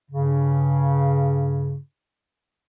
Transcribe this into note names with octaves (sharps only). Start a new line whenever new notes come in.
G2 C#3